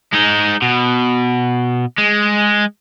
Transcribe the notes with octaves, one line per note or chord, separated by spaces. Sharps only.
G#3 D#4
B2
G#3